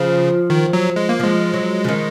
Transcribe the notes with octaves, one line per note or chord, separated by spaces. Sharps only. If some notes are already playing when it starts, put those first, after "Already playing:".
Already playing: C#3 F3
D#3
F#3
G#3
A#3
F3 G#3
F#3
C#3
D#3